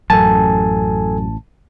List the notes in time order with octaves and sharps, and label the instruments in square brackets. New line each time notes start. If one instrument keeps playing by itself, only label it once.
[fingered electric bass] A1 [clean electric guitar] F#2 [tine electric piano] A4 G#5 [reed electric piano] A5